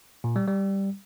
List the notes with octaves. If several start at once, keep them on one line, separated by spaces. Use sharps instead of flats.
A#2
G3
G3